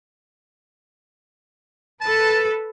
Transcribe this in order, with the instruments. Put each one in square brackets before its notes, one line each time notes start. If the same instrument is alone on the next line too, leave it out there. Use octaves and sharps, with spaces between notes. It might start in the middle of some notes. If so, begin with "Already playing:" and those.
[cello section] A4 B4 [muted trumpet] A5